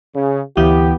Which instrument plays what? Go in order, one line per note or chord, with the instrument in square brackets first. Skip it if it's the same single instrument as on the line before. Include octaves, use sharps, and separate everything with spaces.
[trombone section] C#3
[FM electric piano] D2 E3 E4 [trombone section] B3 G4